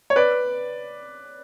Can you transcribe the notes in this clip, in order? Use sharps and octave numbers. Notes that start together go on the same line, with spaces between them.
C#5
B4 D5